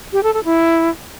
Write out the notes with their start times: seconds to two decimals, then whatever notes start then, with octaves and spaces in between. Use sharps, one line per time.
0.13 G4
0.23 A4
0.34 A4
0.44 E4